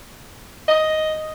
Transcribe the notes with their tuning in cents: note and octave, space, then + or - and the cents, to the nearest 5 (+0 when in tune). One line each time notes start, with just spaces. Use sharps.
D#5 +5